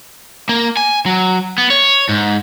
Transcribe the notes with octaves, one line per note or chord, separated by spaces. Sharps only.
A#3
G#5
F#3
B3
C#5
G#2